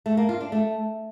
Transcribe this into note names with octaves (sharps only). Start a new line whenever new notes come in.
A3
A#3
F4
D4
A3